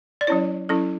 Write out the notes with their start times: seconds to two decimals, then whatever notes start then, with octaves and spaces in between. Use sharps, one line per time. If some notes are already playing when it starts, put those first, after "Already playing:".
0.21 D5
0.27 F#3 C#4 E4 C#5
0.69 F#3 C#4 E4 A4